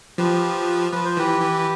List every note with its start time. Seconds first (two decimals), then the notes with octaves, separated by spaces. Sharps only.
0.18 F3 G4 B4
0.92 F3 B4
1.05 C5
1.17 E3 G4 B4
1.40 E3